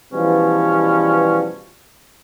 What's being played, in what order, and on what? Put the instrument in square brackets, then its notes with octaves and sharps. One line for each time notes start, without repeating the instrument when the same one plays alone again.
[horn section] B2 E3 F3 G3 B3 C#4